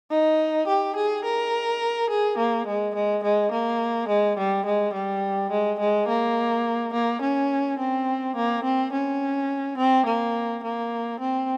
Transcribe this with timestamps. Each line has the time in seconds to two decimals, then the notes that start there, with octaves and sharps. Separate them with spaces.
0.11 D#4
0.68 G4
0.96 G#4
1.25 A#4
2.10 G#4
2.38 A#3
2.67 G#3
2.95 G#3
3.24 G#3
3.52 A#3
4.09 G#3
4.38 G3
4.65 G#3
4.94 G3
5.51 G#3
5.80 G#3
6.08 A#3
6.94 A#3
7.22 C#4
7.79 C4
8.36 A#3
8.64 C4
8.93 C#4
9.78 C4
10.06 A#3
10.64 A#3
11.20 C4